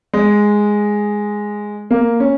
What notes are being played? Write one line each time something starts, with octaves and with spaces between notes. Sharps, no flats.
G#3
A#3
C#4